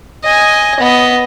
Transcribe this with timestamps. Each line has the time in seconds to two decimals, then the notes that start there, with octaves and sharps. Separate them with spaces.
0.24 D#5 G#5
0.80 B3 D#5